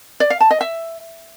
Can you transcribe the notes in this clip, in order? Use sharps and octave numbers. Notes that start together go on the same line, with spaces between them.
D5
F5
A5
D#5
E5